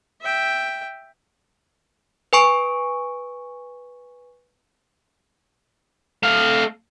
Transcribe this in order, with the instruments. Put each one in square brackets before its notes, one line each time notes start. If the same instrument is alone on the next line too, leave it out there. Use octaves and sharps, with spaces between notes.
[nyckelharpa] E5 G5
[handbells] B4 G#5 C#6 D7
[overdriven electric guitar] A3 F5